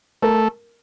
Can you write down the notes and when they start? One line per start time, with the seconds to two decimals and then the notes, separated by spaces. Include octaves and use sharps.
0.22 A3 A#4